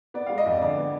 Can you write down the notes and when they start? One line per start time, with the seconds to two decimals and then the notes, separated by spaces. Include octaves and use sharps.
0.14 B3 D5
0.26 G#3 F5
0.38 D#5
0.46 F2 D5
0.62 D3 D5
0.78 B3